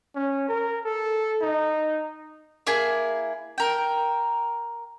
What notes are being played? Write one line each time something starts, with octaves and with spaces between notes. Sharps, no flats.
C#4
A#4
A4
D#4
A#3 E4 G#4
A#4 G5